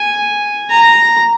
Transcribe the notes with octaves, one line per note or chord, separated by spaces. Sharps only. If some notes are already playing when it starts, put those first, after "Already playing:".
Already playing: G#5
A#5